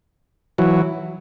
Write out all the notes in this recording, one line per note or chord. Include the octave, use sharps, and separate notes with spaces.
E3 F#3